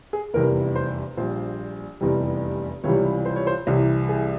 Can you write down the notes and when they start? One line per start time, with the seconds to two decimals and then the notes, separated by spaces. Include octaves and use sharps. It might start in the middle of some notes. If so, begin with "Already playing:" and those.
0.13 G#4
0.34 F1 E2 C3 G3 A#4
0.76 C5
1.17 A#1 A#2 G3 C5
2.01 F1 E2 C3 G3
2.84 C#2 C3 E3 G3 C#5
3.26 C5
3.36 C#5
3.47 C5
3.67 C2 C3 E3
4.09 G#4